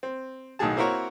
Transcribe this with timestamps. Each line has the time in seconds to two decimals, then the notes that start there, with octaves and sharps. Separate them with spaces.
0.03 C4
0.59 B1 A2 D#3 F#4 G#4 A5
0.77 A#3 C4 E4 F#4 A#4 C#5